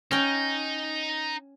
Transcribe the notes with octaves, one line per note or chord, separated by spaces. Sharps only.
C#4 D#4 G5